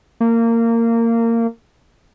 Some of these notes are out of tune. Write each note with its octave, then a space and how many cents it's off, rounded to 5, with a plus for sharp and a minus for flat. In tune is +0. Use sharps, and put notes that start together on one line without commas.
A#3 -20